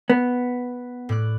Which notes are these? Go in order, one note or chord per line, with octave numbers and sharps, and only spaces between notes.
B3
A2 D5 F#6